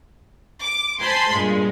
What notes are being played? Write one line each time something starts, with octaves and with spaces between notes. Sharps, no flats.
D6
C5 G#5 A5 B5 C6
G2 A#2 G#3